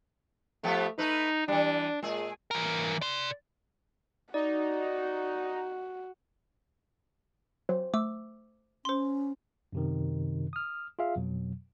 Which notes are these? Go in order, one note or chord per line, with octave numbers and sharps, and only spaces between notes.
F3 A3 B3 G4
A3 D#4 B4
E3 G3 D4
A#2 G#3 G#4
E3 A#4
D5 C6
D#4 F#4 D5
F#3 C5
A3 D6 E6
C#4 C5 C6
F#2 C3 D#3
D#6 F6
F4 G#4 E5 F5
F2 B2 F#3